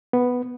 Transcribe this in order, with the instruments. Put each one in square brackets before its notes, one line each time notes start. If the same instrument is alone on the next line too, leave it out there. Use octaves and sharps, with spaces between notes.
[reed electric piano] B3